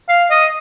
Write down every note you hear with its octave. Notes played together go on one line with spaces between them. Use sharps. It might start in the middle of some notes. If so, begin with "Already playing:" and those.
F5
D#5